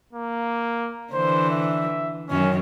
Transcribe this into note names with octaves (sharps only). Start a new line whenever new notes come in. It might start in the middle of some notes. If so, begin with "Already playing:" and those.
A#3
D3 E3 C5
E5
F#2 D#3 C#4